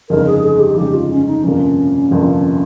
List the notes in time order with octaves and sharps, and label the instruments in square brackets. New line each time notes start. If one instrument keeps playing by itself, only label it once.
[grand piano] G1 F2 C#3 G#3 D#4 [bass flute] A#4
[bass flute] G#4
G#4
G4
[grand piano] G1 F2 C#3 G#3 D#4 [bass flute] G4
[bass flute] F4
C#4
D#4
[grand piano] G1 F2 C3 F3 A#3 [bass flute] C#4
[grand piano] G1 F2 C3 F3 A#3